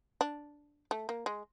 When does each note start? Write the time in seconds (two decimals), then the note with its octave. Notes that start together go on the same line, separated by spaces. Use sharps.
0.21 D4
0.91 A3
1.09 A#3
1.26 G#3